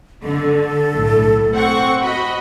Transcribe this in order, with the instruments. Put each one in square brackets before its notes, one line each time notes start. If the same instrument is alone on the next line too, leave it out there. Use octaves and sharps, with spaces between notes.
[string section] D3 [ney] A4
[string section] B1 A2
C4 F#5 C#6
F#4 D#5 B5